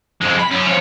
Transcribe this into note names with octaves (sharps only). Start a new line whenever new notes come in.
F2 G#3
B5
F#2 C#4
F2 C#5